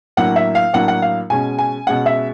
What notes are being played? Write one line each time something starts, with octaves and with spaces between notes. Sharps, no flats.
A2 F#3 A#3 D4 F#5
E5
F5
A2 F#3 A#3 D4 F#5
F#5
F5
B2 G#3 C#4 G#5
G#5
B2 G#3 C#4 F#5
E5